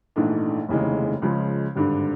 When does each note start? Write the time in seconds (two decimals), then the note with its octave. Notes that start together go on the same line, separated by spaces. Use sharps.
0.16 A#1 G#2 E3 A3 D4
0.69 F1 D#2 C#3 E3 G#3
1.22 C#2 C#3 F3 G#3
1.75 G#1 G2 D3